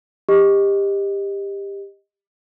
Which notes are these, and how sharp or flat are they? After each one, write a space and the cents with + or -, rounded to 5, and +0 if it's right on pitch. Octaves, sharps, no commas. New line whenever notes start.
G4 +20 D#5 +0